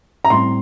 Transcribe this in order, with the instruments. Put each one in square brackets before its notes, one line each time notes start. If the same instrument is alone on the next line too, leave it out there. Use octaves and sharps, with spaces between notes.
[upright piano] A#5
[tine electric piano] A2 G3 C4 [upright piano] C6